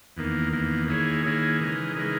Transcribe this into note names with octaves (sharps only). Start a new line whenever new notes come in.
E2 D#3 A#3
E2 D#3 A#3
D#3 A#3 E4 G#4 C#5
D#3 A#3 E4 G#4 C#5
C#3 E3 G#3 D#4 A#4
C#3 E3 G#3 D#4 A#4